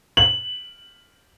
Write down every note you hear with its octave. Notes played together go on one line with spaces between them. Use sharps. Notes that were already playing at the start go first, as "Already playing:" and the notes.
F#7